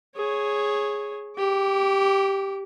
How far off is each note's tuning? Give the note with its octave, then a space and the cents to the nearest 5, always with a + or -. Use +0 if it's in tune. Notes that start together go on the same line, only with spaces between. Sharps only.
G#4 +0 C#5 -10
G4 +0 D6 -30